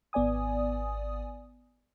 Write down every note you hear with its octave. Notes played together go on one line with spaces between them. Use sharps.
G#1 B3 D5 G#5 D#6